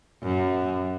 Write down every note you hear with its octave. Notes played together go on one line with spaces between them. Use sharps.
F#2